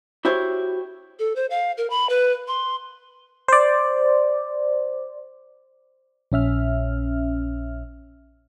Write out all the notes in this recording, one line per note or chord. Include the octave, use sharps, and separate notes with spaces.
E4 F#4 G4 C5 C#5
A4
C5
F5
A#4
B5
B4
C6
C5 D5
A#1 C#4 E5 F6